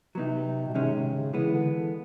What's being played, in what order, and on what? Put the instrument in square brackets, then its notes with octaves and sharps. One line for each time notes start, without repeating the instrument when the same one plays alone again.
[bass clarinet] C3 [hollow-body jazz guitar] F#3 B3 D#4
[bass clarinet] B2
[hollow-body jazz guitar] G#2 D#3 G#3 C#4 [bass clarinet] C3
[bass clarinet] C3
C#3
[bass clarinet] C#3 [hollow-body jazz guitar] E3 G#3 B3
[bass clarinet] D3